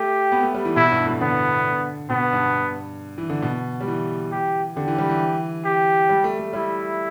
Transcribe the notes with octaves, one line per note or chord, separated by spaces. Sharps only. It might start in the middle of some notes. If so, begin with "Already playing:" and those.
Already playing: A3 G4
B3
A3
G3
E3
B2 E4
G2
A2
D3 B3
B2 B3
G2
E3
D3
B2
G3
E3
G4
D3 G4
E3
G3
E3
G4
G3
A3
A3
G3 E4